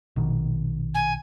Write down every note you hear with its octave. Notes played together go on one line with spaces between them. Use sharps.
A#1 B2 D#3
G#5